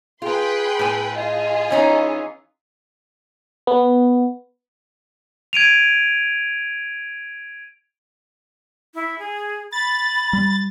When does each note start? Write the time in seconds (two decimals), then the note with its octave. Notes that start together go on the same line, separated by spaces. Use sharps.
0.22 F4 G#4 B4 G5 C6
0.79 A2 G#5
1.15 F4 G#4 D#5
1.71 E3 C#4 D#4
3.67 B3
5.53 G#6 D7 D#7 F7
8.95 E4
9.19 G#4
9.73 B5 A6
10.33 G3